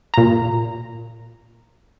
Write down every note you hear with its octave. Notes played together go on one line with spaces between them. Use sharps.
A#2 A#5